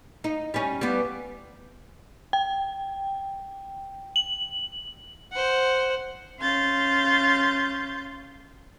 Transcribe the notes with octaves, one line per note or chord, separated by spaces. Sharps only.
D#4
G3 C#4
G3 B3
G5
F#7
C5 F#5
C#4 F5 C6 G6 A6